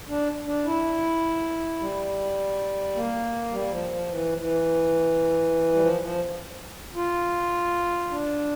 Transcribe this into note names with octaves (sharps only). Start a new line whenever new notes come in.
D4
D4
E4
G3
A#3
G3
F3
F3
E3
F3
E3
G3
F3
F3
F4
D4